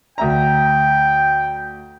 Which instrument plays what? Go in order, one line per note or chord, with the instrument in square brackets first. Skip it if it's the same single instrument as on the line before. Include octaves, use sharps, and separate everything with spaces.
[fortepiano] D2 E5 A#5 [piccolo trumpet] G5